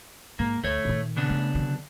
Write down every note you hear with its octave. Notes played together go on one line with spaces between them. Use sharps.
G#2 A#3
D2 A3 C#5
A#2 D#3
C#3 B3 D4
A3
D3 F#3